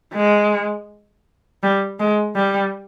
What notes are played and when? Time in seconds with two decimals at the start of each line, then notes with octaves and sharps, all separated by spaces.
0.14 G#3
1.63 G3
2.00 G#3
2.35 G3